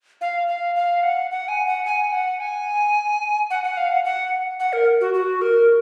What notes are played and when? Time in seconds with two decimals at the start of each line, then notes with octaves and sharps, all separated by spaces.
0.21 F5
0.48 F5
0.76 F5
1.03 F#5
1.31 F#5
1.48 G#5
1.67 F#5
1.85 G#5
2.12 F#5
2.40 G#5
3.50 F#5
3.64 F#5
3.77 F5
3.91 F#5
4.05 F#5
4.60 F#5
4.73 A#4
5.01 F#4
5.14 F#4
5.42 A#4